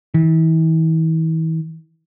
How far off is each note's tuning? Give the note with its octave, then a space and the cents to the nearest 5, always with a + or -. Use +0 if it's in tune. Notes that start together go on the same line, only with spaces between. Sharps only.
E3 -40